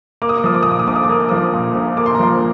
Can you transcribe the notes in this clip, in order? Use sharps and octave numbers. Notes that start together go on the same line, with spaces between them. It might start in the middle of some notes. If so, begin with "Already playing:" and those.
A#3 D6
D#6
D6
F3 D#6
D6
A#2 D#6
D6
D#6
A#1 D6
D#6
D6
A#3 D#6
D6
F3 D#6
D6
A#2
A#1
A#3 D6
C6
A#5
F3 C6